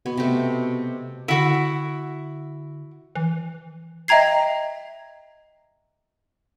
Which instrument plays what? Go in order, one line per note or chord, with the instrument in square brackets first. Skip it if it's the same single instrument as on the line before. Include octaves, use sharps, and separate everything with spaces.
[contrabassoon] B2 [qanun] B3
[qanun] C3 A3
[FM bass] D3 [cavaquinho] E4 F#4
[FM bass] E3
[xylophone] D#5 E5 G5 A#5 G#6 C7